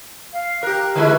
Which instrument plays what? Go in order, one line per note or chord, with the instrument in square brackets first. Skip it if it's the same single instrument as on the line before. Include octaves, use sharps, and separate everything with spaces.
[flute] F5
[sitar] G4 A#4 [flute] F#6
[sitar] D3 G#3 E4 [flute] B4